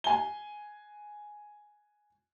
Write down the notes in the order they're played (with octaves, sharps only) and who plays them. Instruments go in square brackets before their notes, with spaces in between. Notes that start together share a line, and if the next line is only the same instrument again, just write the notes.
[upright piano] G#5 G7